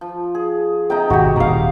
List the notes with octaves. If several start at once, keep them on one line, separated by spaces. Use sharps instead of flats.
F3
G#4
C3 D#4 G5 A#5 B5
G#1 B2 F#4 G4
D#1 A#2 F5 A#5